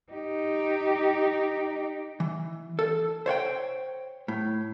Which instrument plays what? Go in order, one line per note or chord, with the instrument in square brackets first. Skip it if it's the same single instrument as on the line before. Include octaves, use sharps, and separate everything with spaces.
[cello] D#4 G4
[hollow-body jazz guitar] E3
A4
C5 C#5 F#5 G5
A2